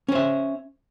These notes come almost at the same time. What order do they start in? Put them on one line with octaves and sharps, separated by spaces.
C#4 C5 E5